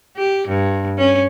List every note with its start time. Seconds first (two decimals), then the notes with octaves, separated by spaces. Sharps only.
0.17 G4
0.48 G2
0.98 C#4